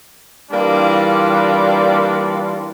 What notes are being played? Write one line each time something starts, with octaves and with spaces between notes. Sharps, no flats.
E3 G3 A#3 D4 F4